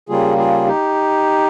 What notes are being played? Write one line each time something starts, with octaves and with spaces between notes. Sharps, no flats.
C#3 G3 A#3 F4 G#4
F4 G#4
D#4 G4